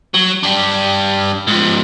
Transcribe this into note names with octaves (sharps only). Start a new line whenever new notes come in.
F#3
G3 D4
G#2 F3